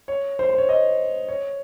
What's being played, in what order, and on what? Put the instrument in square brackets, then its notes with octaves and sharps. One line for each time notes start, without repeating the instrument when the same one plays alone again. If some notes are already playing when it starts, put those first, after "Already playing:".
[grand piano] C#5
C5
C5
C#5
D#5
C#5